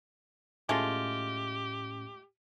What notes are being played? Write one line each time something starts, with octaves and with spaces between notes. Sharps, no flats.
A2 G#3 A3 C#4 F4 G4 A#6